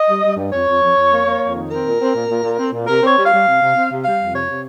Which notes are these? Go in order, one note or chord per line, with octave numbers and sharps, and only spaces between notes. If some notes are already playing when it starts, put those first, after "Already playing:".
Already playing: D#5
G3
G3
G2
F2 C#5
F2
F2
F2
A#3
A#3
F2
D#3
C4 A#4
A#2
C4
A#2
A#2
A#2
C4
A#2
C3 A#4
C4 C#5
G3
F5
G3
C3
C3
C4
C3
G3 F5
F2
C3 C#5
C3